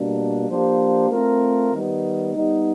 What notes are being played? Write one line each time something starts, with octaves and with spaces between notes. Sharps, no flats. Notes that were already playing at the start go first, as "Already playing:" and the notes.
Already playing: B2 G3 A#3 D4
F3 A#3 D4 G4 C5
A3 C4 F4 A#4
D#3 G3 B3
G3 B3 D#4